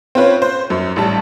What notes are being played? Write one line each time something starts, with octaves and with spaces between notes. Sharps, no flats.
C4 C#4 F4 B4 C#5
C5
F#2
A1 G3 A5